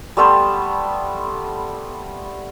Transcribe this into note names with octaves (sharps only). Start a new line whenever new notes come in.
G3 A3 B3 C5